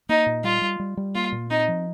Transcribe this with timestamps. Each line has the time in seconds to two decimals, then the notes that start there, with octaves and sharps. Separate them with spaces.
0.09 A#3 D#4
0.26 A#2
0.44 G3 F4
0.61 G3
0.80 G3
0.97 G3
1.15 A#3 F4
1.32 A#2
1.50 C4 D#4
1.68 F3